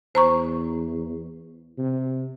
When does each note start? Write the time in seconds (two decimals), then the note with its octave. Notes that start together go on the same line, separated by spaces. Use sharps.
0.15 E2 C5 A#5 C#6
1.78 C3